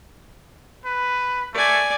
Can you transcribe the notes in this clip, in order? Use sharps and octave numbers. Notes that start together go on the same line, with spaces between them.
B4
A3 D5 G#5